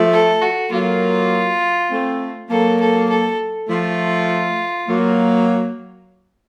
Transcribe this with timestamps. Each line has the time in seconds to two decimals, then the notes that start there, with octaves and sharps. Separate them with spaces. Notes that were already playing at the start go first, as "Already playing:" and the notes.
Already playing: F3 A3
0.13 A4
0.42 F#4
0.72 F#3 A#3 F4
1.91 A3 C4
2.50 F#3 A#3 A4
2.80 A4
3.10 A4
3.69 F3 A3 F4
4.88 F#3 A#3